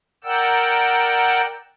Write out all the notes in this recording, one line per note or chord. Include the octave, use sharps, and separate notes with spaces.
A#4 D5 F#5 G5 E6